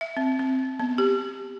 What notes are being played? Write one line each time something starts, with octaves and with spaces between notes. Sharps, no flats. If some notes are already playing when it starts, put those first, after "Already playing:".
E5
C4
C4
B3
G4